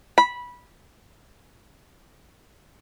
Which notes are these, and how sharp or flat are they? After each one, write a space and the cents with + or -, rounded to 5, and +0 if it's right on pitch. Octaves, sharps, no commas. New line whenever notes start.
B5 -15